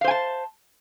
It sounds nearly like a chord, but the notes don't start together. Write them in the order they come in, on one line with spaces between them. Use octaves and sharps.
F5 C5 G#5 A5